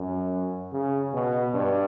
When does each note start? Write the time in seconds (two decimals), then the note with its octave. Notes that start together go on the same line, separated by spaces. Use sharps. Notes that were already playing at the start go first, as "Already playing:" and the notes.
Already playing: F#2
0.72 C#3
1.14 B2
1.55 G2